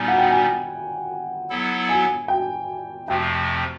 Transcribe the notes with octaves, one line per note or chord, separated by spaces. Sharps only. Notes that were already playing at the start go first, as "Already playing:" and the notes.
Already playing: A#2 G3 B3 D#4 G#5
F#5
G5
G#5
F#3 B3 E4 A4
G#5
G5
F2 C3 F3 A3 C4 G5